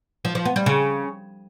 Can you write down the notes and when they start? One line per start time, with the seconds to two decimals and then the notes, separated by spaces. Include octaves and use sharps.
0.25 F3
0.35 F3
0.45 B3
0.56 G3
0.66 C#3